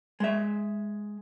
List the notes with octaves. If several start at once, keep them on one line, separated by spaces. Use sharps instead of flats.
G#3 E5